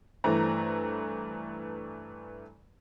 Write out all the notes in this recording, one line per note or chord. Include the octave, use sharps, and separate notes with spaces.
G2 E3 A3 C5 A#5